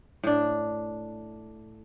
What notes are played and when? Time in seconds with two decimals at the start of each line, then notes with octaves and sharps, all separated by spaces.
0.23 A2 D4